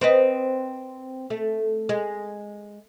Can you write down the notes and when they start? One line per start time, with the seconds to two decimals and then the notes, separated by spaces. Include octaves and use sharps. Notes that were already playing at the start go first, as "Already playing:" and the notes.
0.01 C4 B4 D#5
1.30 A3
1.89 G#3